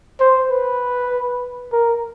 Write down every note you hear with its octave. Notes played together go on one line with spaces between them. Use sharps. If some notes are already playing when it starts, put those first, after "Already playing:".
C5
B4
A#4